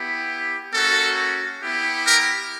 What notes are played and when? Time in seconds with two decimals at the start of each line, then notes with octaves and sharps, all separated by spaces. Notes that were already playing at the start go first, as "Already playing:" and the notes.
Already playing: B3 E4 G4
0.74 A#3 C#4 F#4 A4
1.61 B3 E4 G4
2.05 A#4